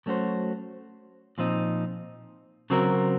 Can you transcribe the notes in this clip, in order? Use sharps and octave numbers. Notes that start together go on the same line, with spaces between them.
F#3 A3 C#4 F#4 C5
A#2 F3 C4 D#4
C#3 F#3 C4 F#4 A#4